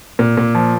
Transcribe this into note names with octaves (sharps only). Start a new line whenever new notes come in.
A#2
A#2
F3